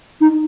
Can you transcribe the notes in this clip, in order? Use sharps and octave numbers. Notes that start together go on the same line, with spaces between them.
D#4